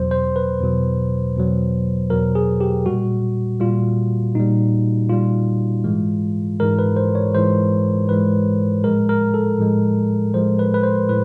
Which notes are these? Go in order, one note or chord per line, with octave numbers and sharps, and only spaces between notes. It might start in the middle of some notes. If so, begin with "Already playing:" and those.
Already playing: E2 B2 F#3 C5
C5
B4
E2 B2 F#3
E2 B2 F#3
E2 B2 F#3 A#4
G#4
G4
A#2 G3 F#4
A#2 G3 F4
A#2 G3 D#4
A#2 G3 F4
G#2 E3 G#3
G#2 E3 G#3 A#4
B4
C5
C#5
G#2 E3 G#3 C5
G#2 E3 G#3 B4
A2 F3 G#3 A#4
A#4
A4
A2 F3 G#3
A2 F3 G#3 C5
B4
B4
C5
A2 B4